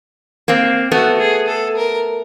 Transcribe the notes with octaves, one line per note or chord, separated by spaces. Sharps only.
A#3 C4
A3 B3 F#4
G#4
A4
A#4